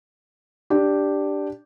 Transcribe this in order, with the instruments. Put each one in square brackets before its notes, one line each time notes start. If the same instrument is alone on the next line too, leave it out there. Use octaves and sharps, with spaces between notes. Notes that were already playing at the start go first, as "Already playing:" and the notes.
[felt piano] D4 G4